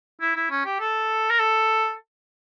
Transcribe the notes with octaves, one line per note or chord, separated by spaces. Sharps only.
E4
E4
C#4
G4
A4
A#4
A4